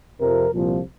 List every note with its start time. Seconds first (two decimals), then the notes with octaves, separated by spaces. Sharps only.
0.19 F2 C3 F3 A#4
0.52 C2 A#2 F3